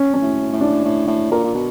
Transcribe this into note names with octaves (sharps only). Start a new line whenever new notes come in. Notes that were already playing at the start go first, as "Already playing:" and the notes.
Already playing: C#4
C#4
A2
A2
D4
A2
A2
A#2 A#4
A#2
B2